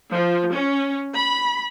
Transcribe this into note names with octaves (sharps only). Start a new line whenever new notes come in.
F3
C#4
B5